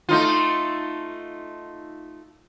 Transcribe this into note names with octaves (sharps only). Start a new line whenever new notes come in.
A3 D#4 F4